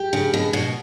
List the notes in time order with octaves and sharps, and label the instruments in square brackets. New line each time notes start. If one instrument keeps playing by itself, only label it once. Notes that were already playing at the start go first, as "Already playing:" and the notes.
Already playing: [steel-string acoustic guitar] G4
C#3
B2
B2